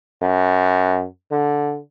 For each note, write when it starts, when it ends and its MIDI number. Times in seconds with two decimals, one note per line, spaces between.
0.22 1.05 42
1.32 1.79 50